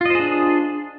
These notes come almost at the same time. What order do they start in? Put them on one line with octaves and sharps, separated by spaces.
F4 D#5 C5 G#4 D4